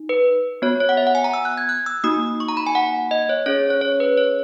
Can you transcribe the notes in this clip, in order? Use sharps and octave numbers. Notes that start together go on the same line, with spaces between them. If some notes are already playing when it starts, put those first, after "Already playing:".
Already playing: D#4
B4
B3 F#4 C#5
C#5
F#5
E5
F#5
G#5
A#5
E6
F#6
G#6
F#6
E6
A#3 D#4 F#4 D#6
C#6
A#5
B5
G#5
F#5
D#5
C#5
C#4 G#4 C#5
C#5
C#5
B4
C#5